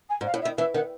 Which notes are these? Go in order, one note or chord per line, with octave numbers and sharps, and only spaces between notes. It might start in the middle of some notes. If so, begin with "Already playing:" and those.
G#5
G#2
F5
A2
E5
D#3
E3 E5
D#3 F#5